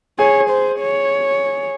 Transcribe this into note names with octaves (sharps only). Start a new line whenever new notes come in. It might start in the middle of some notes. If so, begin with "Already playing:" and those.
G#4 C#5 G#5
C5
C#5